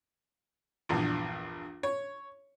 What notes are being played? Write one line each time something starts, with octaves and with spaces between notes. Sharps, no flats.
A#1 E2 G2
C#5